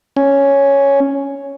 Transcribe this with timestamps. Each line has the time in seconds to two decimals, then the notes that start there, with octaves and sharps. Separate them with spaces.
0.16 C#4